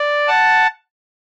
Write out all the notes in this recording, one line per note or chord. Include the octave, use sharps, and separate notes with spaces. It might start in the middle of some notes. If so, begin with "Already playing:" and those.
Already playing: D5
F#5 A5